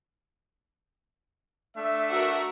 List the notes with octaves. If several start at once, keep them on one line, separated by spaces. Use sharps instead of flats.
A3 D4 E5
F#4 A#4